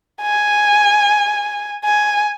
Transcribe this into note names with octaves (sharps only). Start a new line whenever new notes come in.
G#5
G#5